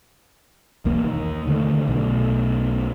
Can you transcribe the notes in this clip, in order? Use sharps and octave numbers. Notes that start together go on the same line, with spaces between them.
B1 E2 A#3
D#2 D#3
D3 D#3 A3
B1 B2 A3